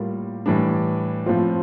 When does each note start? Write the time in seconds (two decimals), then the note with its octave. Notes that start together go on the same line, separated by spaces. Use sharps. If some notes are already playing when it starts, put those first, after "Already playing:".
Already playing: A2 G3 A#3 F4
0.46 A2 E3 G3 D4
1.26 A2 F3 C4 F4